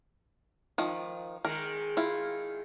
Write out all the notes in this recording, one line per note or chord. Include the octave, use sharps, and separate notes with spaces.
D#3 F3
D#3 G#3 A#4
E4 F4